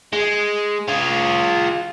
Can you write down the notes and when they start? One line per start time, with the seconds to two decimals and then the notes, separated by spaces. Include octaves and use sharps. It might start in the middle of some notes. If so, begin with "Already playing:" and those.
0.13 G#3
0.88 F4 G#4